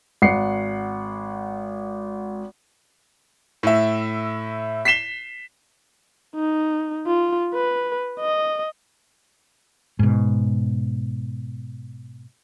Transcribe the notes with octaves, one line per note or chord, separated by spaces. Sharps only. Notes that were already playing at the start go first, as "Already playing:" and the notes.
G#1 F#5 C7 C#7
A2 E5
B6 C7 E7 G7
D#4
F4
B4
D#5
G#2 B2